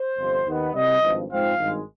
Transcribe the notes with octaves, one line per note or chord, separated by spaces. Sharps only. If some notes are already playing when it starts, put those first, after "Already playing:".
Already playing: C5
G1 F2 C3
D#2 D#3 B3
C2 C3 G3 D#5
G#1 G2 F3
G#2 F3 C4 F5
G#1 G2 D#3 G#3